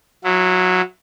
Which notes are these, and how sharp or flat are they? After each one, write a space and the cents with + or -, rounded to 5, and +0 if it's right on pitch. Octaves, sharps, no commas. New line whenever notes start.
F#3 -15 E4 +20